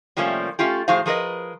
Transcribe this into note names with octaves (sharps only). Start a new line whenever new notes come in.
C3 F3 G3 A3 A#3 C#4
A3 C#4 F4 G4
A2 F3 F#4 G#4 C5 F5
F3 G#4 A#4 B4 D#5